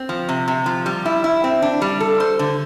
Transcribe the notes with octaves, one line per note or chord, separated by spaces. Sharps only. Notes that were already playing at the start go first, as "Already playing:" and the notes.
Already playing: C4
F3
C3
C3
F3
G3
E4
E4
C4
D4
G3
A4
C5
D3